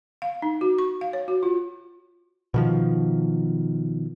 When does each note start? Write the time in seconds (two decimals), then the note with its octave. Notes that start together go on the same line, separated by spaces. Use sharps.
0.22 F5
0.42 D#4
0.61 F#4
0.78 C#6
1.01 F5
1.13 C#5
1.28 F#4
1.43 F4
2.54 B2 D#3 F3